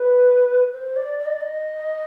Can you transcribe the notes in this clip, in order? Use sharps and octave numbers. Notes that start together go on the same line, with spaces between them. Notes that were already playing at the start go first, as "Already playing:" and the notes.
Already playing: B4
C5
D5
D5
D#5
D5
D#5